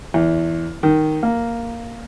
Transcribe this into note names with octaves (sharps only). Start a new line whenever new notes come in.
E2
D#3
A#3